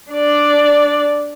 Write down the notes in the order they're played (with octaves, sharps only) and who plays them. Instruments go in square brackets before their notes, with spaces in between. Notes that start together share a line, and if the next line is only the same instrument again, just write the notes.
[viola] D4 D5